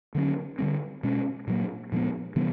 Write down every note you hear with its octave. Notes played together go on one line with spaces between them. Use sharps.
D3 F#3 A#3 C#4
D3 G3 C4
B2 G#3 C#4
A#2 F#3 A#3
A#2 F3 G#3 B3
C3 E3 G3 B3